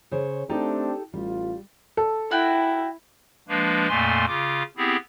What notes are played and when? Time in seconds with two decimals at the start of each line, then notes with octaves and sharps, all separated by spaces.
0.11 C#3 C5 C#5
0.49 A3 C4 D4 D#4 G4 A4
1.14 A1 G3 F4
1.97 A4
2.31 E4 F#4 G5
3.48 F3 G#3 A#3 D4 B4
3.89 F2 A#2 A3 A#3 G#5 C6
4.27 C#3 F4 D6
4.77 B3 C4 E4 G4 G#4